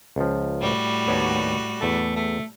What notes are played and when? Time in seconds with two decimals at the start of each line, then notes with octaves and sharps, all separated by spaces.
0.16 C#2 F3
0.59 A2 G3 F#4
1.07 D#2 B3 C#5 D5
1.81 E2 A3 A5
2.16 A3